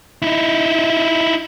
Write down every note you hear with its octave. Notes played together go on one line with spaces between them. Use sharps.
D#4 E4